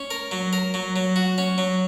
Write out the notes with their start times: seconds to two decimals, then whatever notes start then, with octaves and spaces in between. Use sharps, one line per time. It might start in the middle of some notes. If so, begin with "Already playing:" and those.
Already playing: C#4
0.11 A#4
0.31 F#3
0.53 A#4
0.74 F#3
0.96 F#3
1.16 F#4
1.38 C#4
1.58 F#3